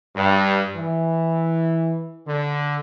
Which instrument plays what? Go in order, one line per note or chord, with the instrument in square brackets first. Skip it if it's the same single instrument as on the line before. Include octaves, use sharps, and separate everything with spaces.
[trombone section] G2
E3
D3